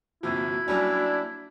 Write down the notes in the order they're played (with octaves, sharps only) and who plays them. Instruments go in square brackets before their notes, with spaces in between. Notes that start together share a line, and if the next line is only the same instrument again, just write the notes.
[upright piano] G1 C3 F3 [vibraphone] A#3 F#4 [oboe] E4
[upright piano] F#3 G3 C#4 [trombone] D4